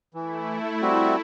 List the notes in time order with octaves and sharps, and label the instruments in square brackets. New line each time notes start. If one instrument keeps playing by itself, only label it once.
[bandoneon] E3 [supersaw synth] A3 E4
[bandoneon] G3 C4 F#4